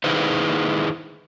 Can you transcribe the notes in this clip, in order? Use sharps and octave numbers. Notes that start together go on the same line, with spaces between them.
D#3 D#4 E4 G#4 B4 C5